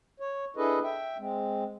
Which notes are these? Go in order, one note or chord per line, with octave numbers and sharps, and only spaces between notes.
C#5
D4 E4 G#4 A4 B4 D#5
E5 G5
G#3 C4